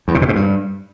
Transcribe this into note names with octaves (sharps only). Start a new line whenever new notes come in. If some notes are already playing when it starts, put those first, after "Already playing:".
E2
C3
B2
G#2
G2